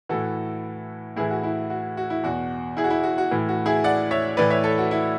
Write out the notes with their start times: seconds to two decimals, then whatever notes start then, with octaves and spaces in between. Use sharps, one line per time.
0.09 A2 E3 F#4 A4
1.16 A2 E3 E4 G#4
1.30 F#4
1.43 E4
1.70 F#4
1.97 F#4
2.10 E4
2.23 E2 B2 F#4
2.77 E4 G#4
2.84 F#4
2.90 E4
3.03 F#4
3.18 F#4
3.31 A2 E3
3.49 F#4
3.66 E4 G#4
3.84 D5 F#5
4.11 C#5 E5
4.37 A2 E3 B4 D5
4.50 C#5 E5
4.64 A4 C#5
4.78 F#4
4.91 E4